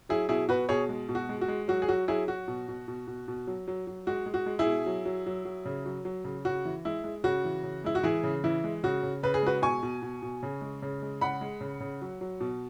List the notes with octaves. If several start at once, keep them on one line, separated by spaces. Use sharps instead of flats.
F#3 E4 G#4
B2 E4 G#4
B2 F#4 B4
B2 G#4 C#5
G#3
B2
F#4
G#3
F#4
G#3
F#3 F#4
G#4
F#3 F#4
F#3 E4 G#4
F#3 F#4
B2
B2
B2
B2
B2
F#3
F#3
F#3
G#3 F#4
G#3
F#4
G#3
E4 G#4
B2
F#3
F#3
F#3
F#3
C#3
F#3
F#3
C#3
C#3 F#4
E3
G#3 E4
G#3
C#3 F#4
E3
C#3
G#3 E4
F#4
E3 E4 G#4
C#3
E3 E4
G#3
C#3 F#4
C#3
C#3 B4
G#4
G#3 F#4 B4
B2 G#5 C#6
B2
B2
B2
C#3
G#3
C#3
G#3
C#3 F#5 B5
G#3
C#3
C#3
F#3
F#3
B2